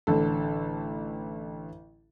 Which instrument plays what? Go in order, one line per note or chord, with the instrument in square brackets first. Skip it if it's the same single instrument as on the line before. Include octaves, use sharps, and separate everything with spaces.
[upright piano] A1 D3 A4